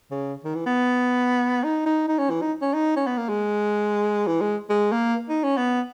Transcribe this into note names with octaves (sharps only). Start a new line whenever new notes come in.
C#3
D#3
E3
B3
D#4
D#4
D#4
C#4
E3
D#4
C#4
D#4
C#4
B3
A#3
G#3
E3
G#3
G#3
A#3
D#4
C#4
B3